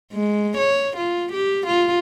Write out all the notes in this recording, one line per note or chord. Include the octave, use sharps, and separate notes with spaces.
G#3
C#5
F4
G4
F4